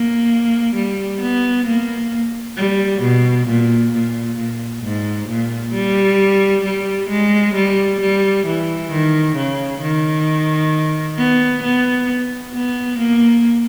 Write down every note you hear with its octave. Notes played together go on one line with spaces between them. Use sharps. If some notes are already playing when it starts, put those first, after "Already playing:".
Already playing: A#3
G3
B3
A#3
G3
B2
A#2
A#2
A#2
G#2
A#2
G3
G3
G#3
G3
G3
E3
D#3
C#3
D#3
B3
B3
B3
A#3